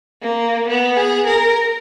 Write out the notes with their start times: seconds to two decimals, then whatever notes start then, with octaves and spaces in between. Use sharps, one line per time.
0.22 A#3
0.68 B3
0.97 G#4
1.27 A#4